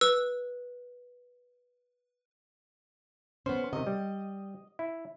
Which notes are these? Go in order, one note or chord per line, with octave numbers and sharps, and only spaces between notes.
B4 E6
B3 C#4 C5
C3 D#3 D#5
G3
E4